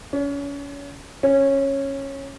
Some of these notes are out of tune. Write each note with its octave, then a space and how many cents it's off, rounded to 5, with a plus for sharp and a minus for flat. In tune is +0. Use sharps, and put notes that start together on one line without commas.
C#4 +30
C#4 -15